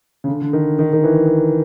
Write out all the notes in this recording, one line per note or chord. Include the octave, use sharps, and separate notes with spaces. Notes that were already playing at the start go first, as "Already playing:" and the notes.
C#3
D3
D3
D#3
D#3
D#3
E3